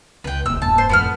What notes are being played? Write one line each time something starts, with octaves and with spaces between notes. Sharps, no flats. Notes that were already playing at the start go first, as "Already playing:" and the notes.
C#2 B4 G5
D#1 C#2 E6
D#1 G2 A5
C5
F2 A2 B3 B4 F6